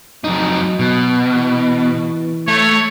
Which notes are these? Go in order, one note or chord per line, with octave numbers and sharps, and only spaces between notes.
F2 F#3 D#4
B2
E3
A3 C#5